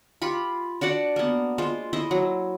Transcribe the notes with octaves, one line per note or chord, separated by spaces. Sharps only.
F4 G4 B5
D4 F#4 D5 F#5
A#3 B3
G#3 F4 C5
E4 C5 D#5
F#3